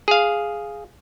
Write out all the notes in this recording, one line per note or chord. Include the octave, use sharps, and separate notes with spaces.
G#4 F5